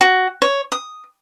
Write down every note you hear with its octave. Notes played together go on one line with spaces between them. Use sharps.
F#4
C#5
D#6